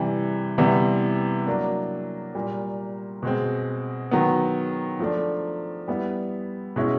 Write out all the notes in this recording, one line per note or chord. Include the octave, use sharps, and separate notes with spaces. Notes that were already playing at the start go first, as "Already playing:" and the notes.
Already playing: C3 E3 G3
C3 E3 G3 B3
F#3 A#3 D4
A#2 G3 A#3
B2 G#3 C4
D#3 F#3 B3
F3 A3 D4
G3 B3 E4
B2 G#3 C#4 E4